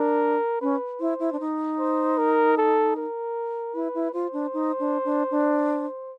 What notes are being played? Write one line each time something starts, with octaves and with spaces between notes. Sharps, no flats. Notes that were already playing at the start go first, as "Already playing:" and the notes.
Already playing: D4 A#4
C#4 B4
E4 C5
E4
D4
D#4
C5
A#4
A4
A#4
E4 B4
E4
F4 C5
D4
D#4
D4
D4
D4